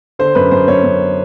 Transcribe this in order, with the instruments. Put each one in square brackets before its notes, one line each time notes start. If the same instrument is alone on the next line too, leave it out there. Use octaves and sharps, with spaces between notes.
[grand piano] D3 C5
F#2 B4
F#2 C5
F#2 C#5
F#2